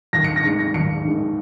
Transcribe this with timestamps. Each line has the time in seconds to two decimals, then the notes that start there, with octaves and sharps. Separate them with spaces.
0.13 D#2 A#6
0.24 C#7
0.36 A#6
0.43 D#3 G#3 C#7
0.59 A#6
0.74 D#2 C#7
1.05 D#3 G#3